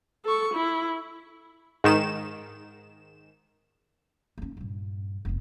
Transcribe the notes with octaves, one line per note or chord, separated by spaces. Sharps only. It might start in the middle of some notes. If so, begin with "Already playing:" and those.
A4 C#6
E4
G#2 D#3 E7
A#3 C#4
G2 A#2
F1 B3